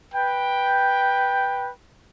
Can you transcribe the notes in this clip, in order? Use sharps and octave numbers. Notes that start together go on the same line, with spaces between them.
B4 G5